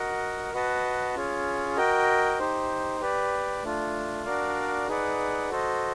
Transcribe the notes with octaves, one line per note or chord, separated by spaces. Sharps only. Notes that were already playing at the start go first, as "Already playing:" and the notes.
Already playing: F#4 A#4 D#5 F#5
F#4 B4 D#5 F#5 A5
C#4 F4 G#4 C#5
F#4 A#4 D#5 G5
D#4 G4 C5
G4 B4 D5
A3 D4 F4
D4 F#4 A#4 D5 F5
D#4 G#4 B4 D5 F#5
F#4 A4 C5 D#5